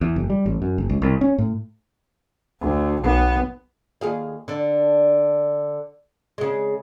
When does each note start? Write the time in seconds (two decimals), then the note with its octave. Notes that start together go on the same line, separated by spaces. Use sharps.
0.01 E2
0.16 F#1
0.30 G3
0.46 A1
0.62 F#2
0.78 F#1
0.89 C#2
1.02 C2
1.21 C#4
1.38 A2
2.61 D2
3.02 B1 B3
4.01 D#2 G#4 F5
4.48 D3 D4
6.38 C#3 G#3